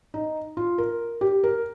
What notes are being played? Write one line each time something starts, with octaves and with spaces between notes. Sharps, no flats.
D#4
F4
A#4
G4
A#4